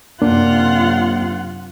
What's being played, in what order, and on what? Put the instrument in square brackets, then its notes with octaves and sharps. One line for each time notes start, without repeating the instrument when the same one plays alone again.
[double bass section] F#2 C3 [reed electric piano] A#3 D4 [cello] F4 F#5